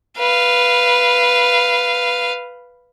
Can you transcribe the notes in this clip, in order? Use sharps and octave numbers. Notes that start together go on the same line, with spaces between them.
B4 F5